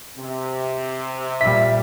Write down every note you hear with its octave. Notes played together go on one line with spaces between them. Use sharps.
C3
A#2 G3 E5 B6